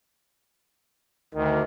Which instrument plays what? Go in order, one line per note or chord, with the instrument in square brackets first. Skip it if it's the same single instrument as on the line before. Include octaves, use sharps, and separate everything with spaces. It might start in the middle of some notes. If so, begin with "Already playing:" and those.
[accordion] D2 [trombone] D#3